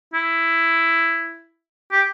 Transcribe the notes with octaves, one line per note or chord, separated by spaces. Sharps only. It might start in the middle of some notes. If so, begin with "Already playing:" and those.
E4
G4